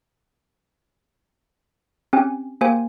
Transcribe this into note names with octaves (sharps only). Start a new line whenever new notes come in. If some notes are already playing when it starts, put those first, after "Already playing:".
C4 C#4 G4 G#5
A#3 G4 C5 G#5